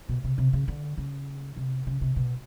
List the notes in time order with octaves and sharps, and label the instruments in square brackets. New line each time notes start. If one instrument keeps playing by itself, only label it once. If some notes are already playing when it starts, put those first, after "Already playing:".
[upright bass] B2
C3
C3
C#3
D3
C#3
C3
C#3
C3
B2